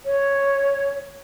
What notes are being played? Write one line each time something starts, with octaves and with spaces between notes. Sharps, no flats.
C#5